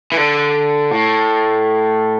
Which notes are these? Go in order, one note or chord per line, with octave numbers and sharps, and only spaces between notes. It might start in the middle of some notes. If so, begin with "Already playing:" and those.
E3
D3
A2